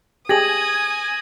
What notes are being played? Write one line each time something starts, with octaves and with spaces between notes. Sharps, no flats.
G4 G#4 G#5 D#6 G#6 A#6 F#7